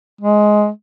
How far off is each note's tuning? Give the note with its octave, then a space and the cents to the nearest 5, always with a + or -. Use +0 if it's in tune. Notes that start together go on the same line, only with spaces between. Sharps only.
G#3 +10